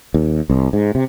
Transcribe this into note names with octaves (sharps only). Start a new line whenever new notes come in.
D#2
C2
G#2
C3